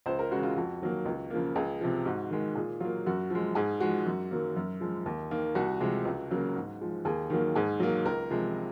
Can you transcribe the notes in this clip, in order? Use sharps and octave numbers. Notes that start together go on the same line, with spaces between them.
C#2 C5
A#4
C#3 G#3 F#4
F4
F2 F#4
D#3 F#3 A#3
C#2
C#3 F3 A#3
C#2 G#4
C3 F3
G#2 F#4
D#3 G#3
A#2 G#4
F#3 A#3 F4
F#2 F#4
F3 G#3
G#2 G#4
F3 G#3 F#4
F#2
D#3 F#3 A#3
F#2
F3 G#3
D#2
D#3 A#3
C2 F#4
C3 F3 G#3
C#2
C#3 F#3 A#3
G#2
F3 G#3
D#2 G#4
D#3 F#3 A#3
G#2 G#4
F#3 A#3
C#2 A#4
C3 F3 G#3